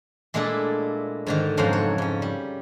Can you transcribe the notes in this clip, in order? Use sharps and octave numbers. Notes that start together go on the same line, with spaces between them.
A#2 G#3 A3 D4 E4 A4
G#2 D3 D#3
F2 G#2 C#3 F#3 C5 A#5
C#5
G#2 C#4
G3